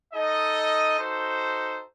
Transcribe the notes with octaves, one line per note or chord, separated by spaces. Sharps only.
D#4 A4 D#5
D#4 F#4 A4 C5